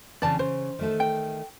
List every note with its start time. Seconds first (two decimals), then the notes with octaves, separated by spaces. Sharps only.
0.22 C#3 E3 C4 D5 A5
0.39 C#3 C5
0.79 D#3 A3 A4
1.00 G5